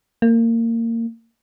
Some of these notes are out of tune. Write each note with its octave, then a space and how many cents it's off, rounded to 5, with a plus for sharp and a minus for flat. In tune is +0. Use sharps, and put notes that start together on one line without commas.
A#3 -25